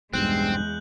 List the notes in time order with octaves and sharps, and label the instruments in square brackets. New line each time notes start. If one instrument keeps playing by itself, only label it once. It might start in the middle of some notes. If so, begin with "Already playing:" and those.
[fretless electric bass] B1 G2 [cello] E2 G#3 [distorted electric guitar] C4 [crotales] F#6 G6 F#7